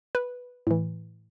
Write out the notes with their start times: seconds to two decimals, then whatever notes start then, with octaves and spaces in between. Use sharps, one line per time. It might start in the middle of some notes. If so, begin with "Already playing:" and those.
0.15 B4
0.67 A2 E3